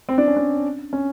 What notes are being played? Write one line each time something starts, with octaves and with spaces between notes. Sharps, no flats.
C4
D4
C#4
D4
C#4